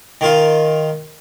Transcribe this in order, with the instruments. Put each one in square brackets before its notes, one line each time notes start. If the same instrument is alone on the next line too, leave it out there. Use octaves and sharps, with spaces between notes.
[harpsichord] D#3 F4